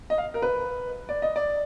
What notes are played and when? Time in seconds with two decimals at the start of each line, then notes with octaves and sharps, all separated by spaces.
0.10 D#5
0.18 F5
0.34 A#4
0.42 B4
1.09 D5
1.22 D#5
1.36 D5